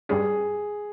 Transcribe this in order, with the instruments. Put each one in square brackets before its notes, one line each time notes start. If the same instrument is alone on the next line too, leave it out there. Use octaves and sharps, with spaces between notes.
[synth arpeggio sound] G2 G3 C#4 [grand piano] G#4